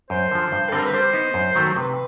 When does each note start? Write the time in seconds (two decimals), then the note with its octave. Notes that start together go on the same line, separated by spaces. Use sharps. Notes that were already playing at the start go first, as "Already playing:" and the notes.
0.10 F#2 C5
0.31 D3 F3
0.52 G2
0.69 A4
0.72 D3 G3 C4 A#4
0.85 B4
0.93 G3 C5
1.13 B3 D#4
1.34 F#2
1.55 D#3 F#3 A3
1.76 C3 B4